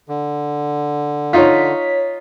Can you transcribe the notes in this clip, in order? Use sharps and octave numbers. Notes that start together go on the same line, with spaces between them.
D3
D#4 F4 C#5 B6